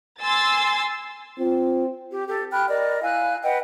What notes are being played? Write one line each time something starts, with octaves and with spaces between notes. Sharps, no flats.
G#5 C6 E6 A6
C4 F4
G4
G4 A4
G5 B5 F6 F#6
A#4 D5 D#5
E4 F5 G#5 F#6
B4 D#5 F#5 G5